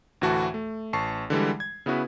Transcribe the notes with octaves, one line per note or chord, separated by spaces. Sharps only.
D2 A2 E3 F#4 F#5 A5
A3
A1 A5 C#6 C7
D3 E3 G3 G#3
G#6
C#3 B3 E4 F#4 B4